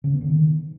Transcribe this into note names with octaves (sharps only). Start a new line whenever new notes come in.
C#3
B3
D3
D#3